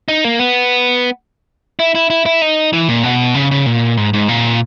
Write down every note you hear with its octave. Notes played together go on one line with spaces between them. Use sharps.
D#4
A#3
B3
E4
E4
E4
E4
D#4
E3
A#2
B2
C#3
C#3
A#2
G#2
G#2
A#2